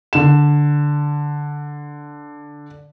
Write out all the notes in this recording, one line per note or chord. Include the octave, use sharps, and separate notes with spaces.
D3 E7